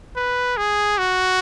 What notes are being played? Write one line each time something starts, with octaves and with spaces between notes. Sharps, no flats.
B4
G#4
F#4